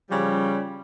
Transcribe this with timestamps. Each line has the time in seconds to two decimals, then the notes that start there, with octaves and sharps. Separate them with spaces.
0.10 C#3 F3 G3